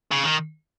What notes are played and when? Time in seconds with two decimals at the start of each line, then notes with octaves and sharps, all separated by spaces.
0.12 C#3
0.24 D#3